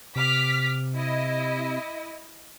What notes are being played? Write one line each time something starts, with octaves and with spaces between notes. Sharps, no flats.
C3 D6 F6 B6
E4 D#5